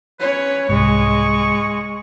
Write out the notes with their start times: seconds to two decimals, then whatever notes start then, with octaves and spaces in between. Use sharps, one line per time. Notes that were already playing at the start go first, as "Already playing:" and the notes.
0.20 C#4 B4 C#5
0.69 C2 G#2 G#3 C#6